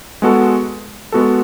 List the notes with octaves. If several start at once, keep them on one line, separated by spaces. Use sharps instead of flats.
G#3 B3 F#4 A4
G#3 B3 F#4 A4